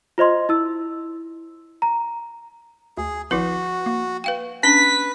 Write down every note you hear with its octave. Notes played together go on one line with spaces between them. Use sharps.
F4 C5 D#5 C6
E4 E6
A#5
D2 G#4
G#1 F3 E4 F#4 B4
A#3
B4 F5 G5
C#4 D4 B4 B6